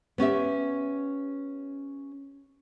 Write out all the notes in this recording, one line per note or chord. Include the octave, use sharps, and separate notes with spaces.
B3 C#4 G4 E5